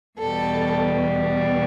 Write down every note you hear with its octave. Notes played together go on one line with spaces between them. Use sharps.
E2 B2 G3 A4